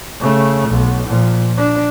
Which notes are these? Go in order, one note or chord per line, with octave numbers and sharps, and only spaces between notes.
C#3 A3
B1
A#2 F3
D4